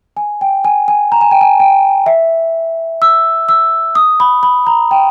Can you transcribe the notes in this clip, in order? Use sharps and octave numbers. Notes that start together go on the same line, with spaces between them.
G#5
G5
G#5
G#5
A#5
G#5
G5
G#5
G5
E5
E6
E6
D#6
B5
B5
A#5
G5